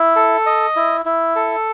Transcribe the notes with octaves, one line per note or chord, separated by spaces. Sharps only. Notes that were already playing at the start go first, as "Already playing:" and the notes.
Already playing: E4
A4
D#5
E4
E4
A4